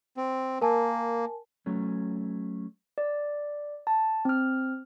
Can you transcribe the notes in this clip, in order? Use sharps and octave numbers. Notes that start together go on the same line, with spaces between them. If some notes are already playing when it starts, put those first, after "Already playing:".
C4
A#3 A#4 G#5 A5
F#3 A3 C#4
D5
A5
C4 F6